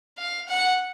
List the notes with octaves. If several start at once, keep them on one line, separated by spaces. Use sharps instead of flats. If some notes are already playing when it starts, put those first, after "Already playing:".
F5
F#5